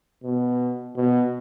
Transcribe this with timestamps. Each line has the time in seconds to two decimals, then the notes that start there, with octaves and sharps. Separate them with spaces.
0.24 B2
0.96 B2